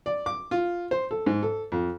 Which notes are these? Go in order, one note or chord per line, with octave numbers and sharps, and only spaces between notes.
D5
D6
F4
C5
A4
G#2
A4
F2